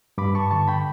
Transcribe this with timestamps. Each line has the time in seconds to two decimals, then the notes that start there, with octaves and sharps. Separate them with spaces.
0.18 G2 B5 D6
0.35 A5 C#6
0.51 D3 A5 C#6
0.68 G5 B5